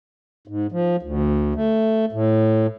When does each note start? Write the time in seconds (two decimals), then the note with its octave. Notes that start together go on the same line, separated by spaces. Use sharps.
0.47 G#2
0.72 F3
1.02 D2
1.55 A3
2.12 A2